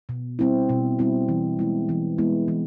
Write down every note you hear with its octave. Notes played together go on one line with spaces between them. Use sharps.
B2
G3 C4 E4
B2
G3 C4 E4
E3
G#3 B3 E4
E3
G#3 B3 E4
E3